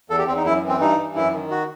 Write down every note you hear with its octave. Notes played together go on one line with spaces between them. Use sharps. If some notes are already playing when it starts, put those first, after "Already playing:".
E2 A4
G4
E2 C4
D#4
F#2 E4
E3
C4
G2 D#4
E3
F#2 E4
D#3
F#4